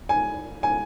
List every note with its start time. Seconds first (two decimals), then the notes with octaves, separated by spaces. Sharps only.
0.09 G#5
0.63 G#5